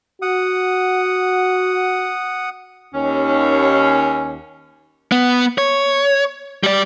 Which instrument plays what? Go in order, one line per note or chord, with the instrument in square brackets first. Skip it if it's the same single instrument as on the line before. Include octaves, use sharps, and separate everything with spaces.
[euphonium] F#4 [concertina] F#5 D#6
[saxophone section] D#2 C#4
[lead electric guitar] B3
C#5
G3 D5